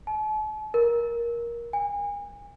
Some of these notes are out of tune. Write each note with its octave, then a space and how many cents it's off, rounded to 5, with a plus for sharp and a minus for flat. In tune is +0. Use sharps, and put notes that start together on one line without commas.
A5 -45
A#4 +15
G#5 -35